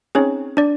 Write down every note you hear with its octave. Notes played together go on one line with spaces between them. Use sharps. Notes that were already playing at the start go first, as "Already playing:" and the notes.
C4 C#4 D#4 G#4 C#5
D4 D5